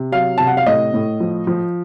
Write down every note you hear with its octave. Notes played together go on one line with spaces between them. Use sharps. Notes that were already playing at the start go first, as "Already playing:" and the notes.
Already playing: C3
F#3 F5
C3 A5
F#5
F5
A2 D#5
A2
F3
F3